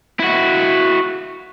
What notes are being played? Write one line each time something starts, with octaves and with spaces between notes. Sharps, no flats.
E4 F#4